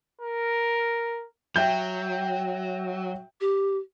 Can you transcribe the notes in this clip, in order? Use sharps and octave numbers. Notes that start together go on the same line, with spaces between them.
A#4
F#3 E5 G5 G6
G4